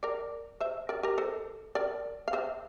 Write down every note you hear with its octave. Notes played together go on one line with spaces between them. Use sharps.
A#4 D5
C5 E5
A#4 D5
G4 A#4
A4 C5
A#4 D5
F5
C5 E5